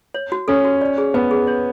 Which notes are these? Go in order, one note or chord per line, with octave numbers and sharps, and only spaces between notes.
C#5
F#4
C#4 A4
F#4
D5
G#4
B3 B4
G#4
C#5